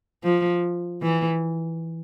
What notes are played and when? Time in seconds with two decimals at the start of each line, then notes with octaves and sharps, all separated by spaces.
0.24 F3
1.02 E3